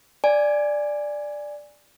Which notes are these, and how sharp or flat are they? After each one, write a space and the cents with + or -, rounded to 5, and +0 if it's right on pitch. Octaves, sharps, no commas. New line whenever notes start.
D5 +0 G#5 -10